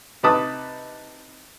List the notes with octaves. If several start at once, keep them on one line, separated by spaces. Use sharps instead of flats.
C3 D#4 B4 A5 D6 D#6